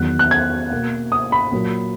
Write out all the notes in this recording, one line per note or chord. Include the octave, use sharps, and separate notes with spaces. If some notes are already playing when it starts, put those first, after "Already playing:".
Already playing: E2 D#3 F#3 F#6
F#6
G#6
B2 A#3
D#6
B5
A#2 F#3 A#3